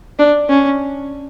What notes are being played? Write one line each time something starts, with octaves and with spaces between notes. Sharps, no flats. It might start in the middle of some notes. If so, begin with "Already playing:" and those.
D4
C#4